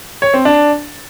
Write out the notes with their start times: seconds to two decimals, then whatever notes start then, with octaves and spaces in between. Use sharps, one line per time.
0.22 C#5
0.34 C4
0.45 D4